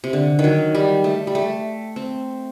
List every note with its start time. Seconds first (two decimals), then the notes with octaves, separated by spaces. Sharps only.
0.04 C3
0.13 D3
0.39 D#3
0.44 F#3
0.75 G3
1.04 A3
1.27 G3
1.35 A3
1.96 C4